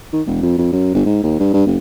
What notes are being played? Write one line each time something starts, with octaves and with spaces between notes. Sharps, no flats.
D#3
E1
F2
F2
F#2
G1
G#2
D#2
G2
G2
F#1